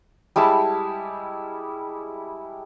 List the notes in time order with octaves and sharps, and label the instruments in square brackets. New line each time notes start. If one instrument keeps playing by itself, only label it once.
[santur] G3 G#3 E4 A5